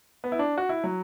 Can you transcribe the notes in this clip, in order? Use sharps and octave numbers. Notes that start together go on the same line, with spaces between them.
B3
E4
D4
F#4
E4
F#3